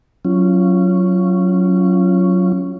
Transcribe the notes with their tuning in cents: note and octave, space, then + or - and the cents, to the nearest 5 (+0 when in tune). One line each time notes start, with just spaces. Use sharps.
F#3 +0 C#4 +0 F4 -25